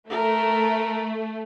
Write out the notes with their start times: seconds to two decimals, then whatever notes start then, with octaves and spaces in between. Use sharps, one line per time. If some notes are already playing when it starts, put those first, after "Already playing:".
0.10 A3 A#4